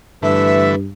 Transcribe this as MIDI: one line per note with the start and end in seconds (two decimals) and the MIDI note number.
0.22 0.92 43
0.22 0.76 50
0.22 0.76 52
0.22 0.76 57
0.22 0.75 71
0.22 0.69 76